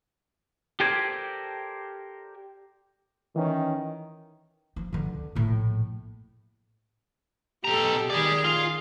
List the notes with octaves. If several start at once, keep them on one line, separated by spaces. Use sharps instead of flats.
G4 A4 A#4 C5 D5 G#5
D#3 E3 C#4
F3
C#2 D3
A#1 A2
B2 G4 A4 A#5
D#3 G4 G#4 D5
F4